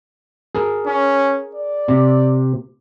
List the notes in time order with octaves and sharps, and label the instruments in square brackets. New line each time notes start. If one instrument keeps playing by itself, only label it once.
[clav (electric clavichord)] G#4 A#4
[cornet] C#4
D5
[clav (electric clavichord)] C3